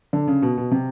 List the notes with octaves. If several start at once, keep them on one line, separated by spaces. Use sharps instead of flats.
D3
C#3
B2
B2
C3